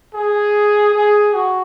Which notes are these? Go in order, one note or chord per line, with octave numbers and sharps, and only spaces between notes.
G#4
G#4
F#4